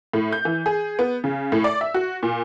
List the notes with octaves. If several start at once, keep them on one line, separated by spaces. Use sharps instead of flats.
A2
G6
E3
G#4
B3
C#3
A2
D5
E5
F#4
A#2